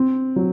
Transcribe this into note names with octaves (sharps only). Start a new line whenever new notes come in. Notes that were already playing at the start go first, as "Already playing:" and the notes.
Already playing: C4
F#3